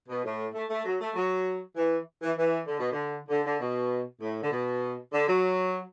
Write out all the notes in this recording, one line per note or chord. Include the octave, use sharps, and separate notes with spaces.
B2
A2
A3
A3
F#3
A3
F#3
E3
E3
E3
D3
B2
D3
D3
D3
B2
A2
D3
B2
D3
F#3